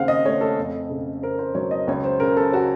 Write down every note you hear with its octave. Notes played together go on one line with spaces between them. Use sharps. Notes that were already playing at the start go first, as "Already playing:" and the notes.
Already playing: D#2 C#3 C4 F5 F#5
D#5
A3 C#5
A4
F2
C#3
C4 A#4
C5
F#3 C#5
D#5
C#2 C#5
C5
C#3 A#4
A4
C#4 F#4